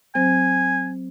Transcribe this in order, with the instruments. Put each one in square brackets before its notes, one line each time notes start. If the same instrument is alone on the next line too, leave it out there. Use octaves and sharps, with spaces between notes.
[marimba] F#3 C4 C5 [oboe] G#5